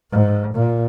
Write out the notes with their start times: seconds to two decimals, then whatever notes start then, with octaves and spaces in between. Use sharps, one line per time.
0.11 G#2
0.54 A#2